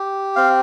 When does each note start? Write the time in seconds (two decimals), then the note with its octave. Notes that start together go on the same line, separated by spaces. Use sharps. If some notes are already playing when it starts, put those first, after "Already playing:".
Already playing: G4
0.36 C4 F5